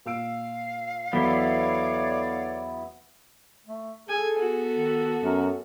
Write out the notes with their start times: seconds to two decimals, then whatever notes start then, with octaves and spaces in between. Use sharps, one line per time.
0.06 A#2 F5 E6 D7
1.13 E2 F#3 B3 E4 A4 C#5 D5 G7
3.66 A3
4.09 G#4 A4 G#5
4.39 B3 F#4
4.74 D#3
5.24 F#2 A#4